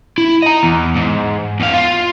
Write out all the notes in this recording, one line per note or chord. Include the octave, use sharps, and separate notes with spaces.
E4
D#5 A#5
E2
G#2
E2 F5
F4